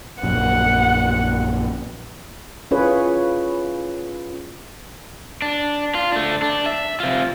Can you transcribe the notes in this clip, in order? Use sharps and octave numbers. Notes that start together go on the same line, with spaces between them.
A#1 F#2 F#5
C#4 E4 F4 G#4 B4 C#5
D4
F4
A3 D4
D4
E5
C3 F4